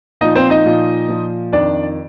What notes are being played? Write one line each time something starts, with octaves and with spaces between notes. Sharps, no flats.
A#2 F3 D#4 D#5
C4 C5
D#4 D#5
A#2 F3
A#2 F3
F2 D#3 D4 D5